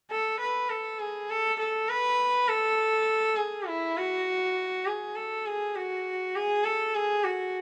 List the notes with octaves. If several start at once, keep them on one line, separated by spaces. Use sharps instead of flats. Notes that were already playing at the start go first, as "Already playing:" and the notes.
A4
B4
A4
G#4
A4
A4
B4
A4
G#4
E4
F#4
G#4
A4
G#4
F#4
G#4
A4
G#4
F#4